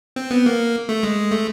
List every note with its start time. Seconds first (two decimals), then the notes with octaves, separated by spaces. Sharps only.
0.16 C4
0.31 B3
0.46 A#3
0.89 A3
1.03 G#3
1.31 A3